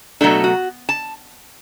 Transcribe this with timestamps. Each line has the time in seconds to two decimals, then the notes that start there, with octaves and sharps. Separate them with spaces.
0.21 B2 F#3 A3 D4 A4
0.44 F#4
0.89 A5